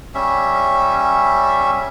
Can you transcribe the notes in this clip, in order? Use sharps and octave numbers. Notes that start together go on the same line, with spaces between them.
G3 C#4 E5